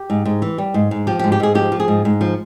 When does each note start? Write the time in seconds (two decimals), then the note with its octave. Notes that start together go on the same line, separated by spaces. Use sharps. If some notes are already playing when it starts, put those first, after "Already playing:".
Already playing: G4
0.10 G#2
0.25 G#2
0.42 E3
0.58 G3
0.74 G#2
0.91 G#2
1.07 F3 G4
1.19 G4
1.24 G#2
1.32 G4
1.40 G#2 G#4
1.55 F3 G4
1.72 F3
1.80 G#4
1.88 G#2
2.05 G#2
2.21 F3